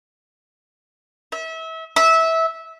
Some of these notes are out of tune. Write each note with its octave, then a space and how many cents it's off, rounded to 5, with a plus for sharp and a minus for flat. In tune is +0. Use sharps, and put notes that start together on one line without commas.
E5 -30
E5 -20